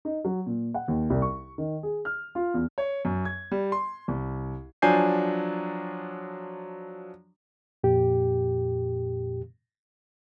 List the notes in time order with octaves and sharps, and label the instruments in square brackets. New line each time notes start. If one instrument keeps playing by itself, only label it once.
[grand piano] D#4
F#3
A#2
F#5
D#2
C2
C#6
D#3
G#4
F6
F4
E2
C#5
F#2
G#6
G3
C6
C2
[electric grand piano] F3 F#3 D4 G#5 G6 C7
[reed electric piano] F2 A#2 G4